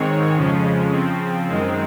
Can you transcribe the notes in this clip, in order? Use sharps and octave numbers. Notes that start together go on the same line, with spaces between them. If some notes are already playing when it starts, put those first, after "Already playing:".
Already playing: G#2 D#3 G#3 C4 C#5
F2 C#3 F3 G#3 C#4
C#3 F3 C4
F#2 D#3 G#3 C4